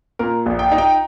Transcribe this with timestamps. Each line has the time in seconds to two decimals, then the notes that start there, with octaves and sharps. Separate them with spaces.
0.19 A#2 A#4
0.46 A#1
0.59 G5
0.72 D#4
0.78 G5